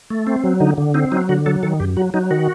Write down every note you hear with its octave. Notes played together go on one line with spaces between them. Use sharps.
A3
C4
F#3
D3 D#4
D3
C4 D#4
F#3 D#4
D3 F#4
F#3 A4
D#3 A4
F#2 G4
F#3 F#4
F#3 D#4
D#3 F#4